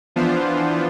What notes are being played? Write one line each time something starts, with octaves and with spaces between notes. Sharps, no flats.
E3 F3 B3 D4 F4 C5